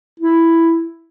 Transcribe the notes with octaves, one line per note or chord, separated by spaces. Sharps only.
E4